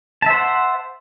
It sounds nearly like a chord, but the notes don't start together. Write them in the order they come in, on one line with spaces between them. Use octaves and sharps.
A5 E5 C5 F#5